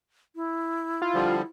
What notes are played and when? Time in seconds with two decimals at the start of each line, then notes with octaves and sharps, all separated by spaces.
0.36 E4
1.02 F4
1.15 D3 F3 G3